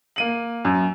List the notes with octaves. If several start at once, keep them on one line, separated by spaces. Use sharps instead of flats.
A#3 D#7 F#7
F#2